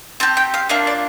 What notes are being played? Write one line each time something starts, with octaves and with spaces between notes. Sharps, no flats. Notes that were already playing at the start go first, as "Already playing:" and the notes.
C4 G4 A5
G5
F5
A#3 D4 F4 E5
D5